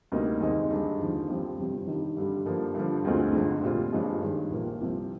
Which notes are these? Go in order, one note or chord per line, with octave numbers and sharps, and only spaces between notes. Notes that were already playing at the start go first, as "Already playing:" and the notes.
D2 C3 G3 A#3 D#4
D#2 D#3 G#3 C4 D#4
G2 D3 G#3
D#2 D3 F3
G2 F3 C4 G4
G1 F2 C3 G3
G2 D#3 G3
G2 D3 G3
G2 D3 F3 A#3
G2 D3 F3
D2 D3 G#3 C4 F4
F1 F2 D3 G#3
A#2 G3 C4 F4
G1 G2 D3 F3 G#3
G2 D#3 G#3
A#1 A#2 F3 A#3
C2 C3 F3